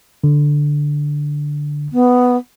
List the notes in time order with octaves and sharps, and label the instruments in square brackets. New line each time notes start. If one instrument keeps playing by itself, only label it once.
[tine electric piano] D3
[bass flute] B3